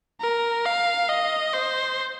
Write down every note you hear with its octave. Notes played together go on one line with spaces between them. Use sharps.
A#4
F5
D#5
C5